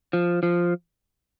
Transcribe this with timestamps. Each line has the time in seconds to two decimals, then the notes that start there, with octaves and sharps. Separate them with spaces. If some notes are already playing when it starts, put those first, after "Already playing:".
0.13 F3
0.43 F3